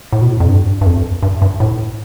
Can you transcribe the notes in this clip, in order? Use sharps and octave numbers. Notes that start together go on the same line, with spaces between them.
A2
B2
A2
F2
G2
G2
F2
G2
G2
A2